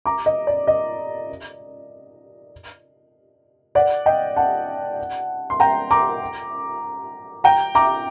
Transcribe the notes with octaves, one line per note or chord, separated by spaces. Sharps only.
A#5 D6
D#5
D5
D#5
D5 F#5
D#5 G5
F#5 A5
C6
G5 A#5
A#5 D6
G5 A#5
A#5 D6